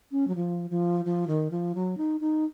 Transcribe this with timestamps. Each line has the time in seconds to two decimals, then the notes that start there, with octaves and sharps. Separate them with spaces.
0.11 C#4
0.28 F#3
0.35 F3
0.70 F3
1.05 F3
1.27 D#3
1.51 F3
1.75 F#3
1.97 D#4
2.20 D#4